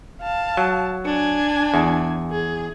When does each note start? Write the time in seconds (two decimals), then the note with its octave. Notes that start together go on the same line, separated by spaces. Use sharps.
0.21 F5 A5
0.57 F#3
1.05 D4 G#5
1.74 E2
2.31 G#4